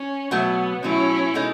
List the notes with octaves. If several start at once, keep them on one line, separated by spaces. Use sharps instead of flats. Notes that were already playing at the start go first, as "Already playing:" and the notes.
Already playing: C#4
B2 F#3 A3 B3
B2 F#3 A3 C#4 E4
B2 G#3 D#4 A4